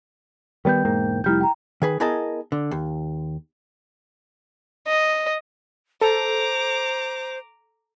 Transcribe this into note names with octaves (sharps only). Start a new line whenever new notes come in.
D#3 G3 B3 G5 G6
E1 G#2 A#3
F1 G3 E4 F6 G6
G5 A#5
D#3 G#4 B4
B3 E4 G#4 A#4 D#5 A5
D3
D#2
D#5
A4 C5 A#5 D6